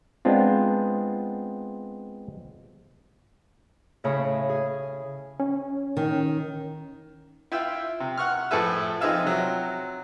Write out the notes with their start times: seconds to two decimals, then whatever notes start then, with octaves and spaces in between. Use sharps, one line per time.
0.25 G#3 B3 C4 D4 F4
4.04 A2 C#3 C#5 B5 D#6
4.49 G#4
5.40 C#4
5.97 D#3
7.52 E4 F4 G5 E6
8.00 C3
8.18 F#5 C#6 F6
8.51 A2 F3 G#4 A4 B4 E5
9.01 F3 C4 D#4 G#4 E5 F5
9.23 C3 F#3